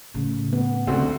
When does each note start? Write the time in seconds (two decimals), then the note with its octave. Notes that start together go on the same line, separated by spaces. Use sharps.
0.14 A2 C#3
0.53 B3
0.87 D2 C#3 C4 F#4